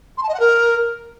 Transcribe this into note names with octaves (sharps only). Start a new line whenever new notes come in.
C6
A5
D#5
F#5
A#4